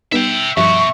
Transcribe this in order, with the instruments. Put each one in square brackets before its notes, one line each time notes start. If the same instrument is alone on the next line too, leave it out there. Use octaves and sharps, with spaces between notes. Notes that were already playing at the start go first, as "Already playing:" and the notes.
[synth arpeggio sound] G3 B3 D#4 [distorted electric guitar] E5 G5
[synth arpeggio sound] G2 F3 C#7 [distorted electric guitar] B2 F#4 [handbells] E5 [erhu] C#6